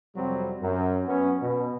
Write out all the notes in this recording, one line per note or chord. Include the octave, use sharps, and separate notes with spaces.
F2 C3 F#3 G3 C4
F#2
F#3 B3 C#4
B2